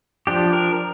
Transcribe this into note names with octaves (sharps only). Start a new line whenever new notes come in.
F3 D4 G4
A#4